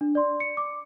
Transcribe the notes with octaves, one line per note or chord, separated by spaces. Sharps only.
D4
D5 C6
C#7
D6